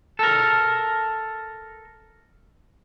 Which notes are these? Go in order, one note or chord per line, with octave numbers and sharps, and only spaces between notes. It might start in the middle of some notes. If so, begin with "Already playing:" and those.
A4 A#4